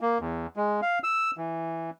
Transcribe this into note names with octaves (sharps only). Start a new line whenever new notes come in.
A#3
E2
G#3
F5
E6
E3